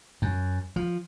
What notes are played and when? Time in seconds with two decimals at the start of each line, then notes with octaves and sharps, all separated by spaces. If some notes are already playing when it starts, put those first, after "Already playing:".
0.22 F#2
0.76 F3